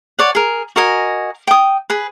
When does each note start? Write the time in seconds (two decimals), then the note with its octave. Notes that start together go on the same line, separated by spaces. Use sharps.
0.19 C#5 D5 F#5
0.35 G#4 A#4
0.76 F#4 A#4 D#5 G#5
1.47 G5 D#6
1.90 G#4 B4